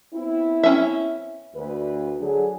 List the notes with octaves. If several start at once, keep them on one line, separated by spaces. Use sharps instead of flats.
B3 C4 E4
C#4 E5
D2 B4
D3 F#3 G#4